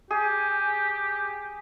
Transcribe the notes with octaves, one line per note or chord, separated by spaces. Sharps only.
G4 G#4